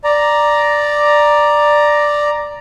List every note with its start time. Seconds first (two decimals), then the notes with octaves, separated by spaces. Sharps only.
0.04 D5 A#5